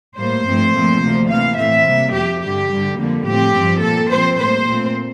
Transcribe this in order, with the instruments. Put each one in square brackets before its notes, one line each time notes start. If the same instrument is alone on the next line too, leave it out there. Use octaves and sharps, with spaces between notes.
[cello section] A2 G3 A#3 C5
G2 F3 A3 C4
A#2 F3 A3 C4
D2 C3 F3 A#3
C3 E3 A#3 F5
A2 E3 A3 C4 E5
C3 G3 A#3
F2 C3 F3 G4
G2 D3 G3 G4
G2 D3 G3
F2 D3 G3 A#3
A2 F3 C4 G4
G2 F3 C4
A#2 F3 A#3 A4
A#2 F3 C4 C5
A2 G3 A#3 C5
A#2 A3 C4